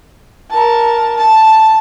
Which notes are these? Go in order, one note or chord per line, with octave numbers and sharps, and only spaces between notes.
A#4 A5
A5